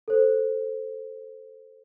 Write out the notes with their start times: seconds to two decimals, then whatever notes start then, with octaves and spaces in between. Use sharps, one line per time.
0.08 A4 C5